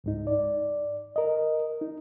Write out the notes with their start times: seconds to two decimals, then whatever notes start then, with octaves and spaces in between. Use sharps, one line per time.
0.04 C#2 G#2 D#4
0.27 D5
1.16 A#4 D#5
1.81 D#4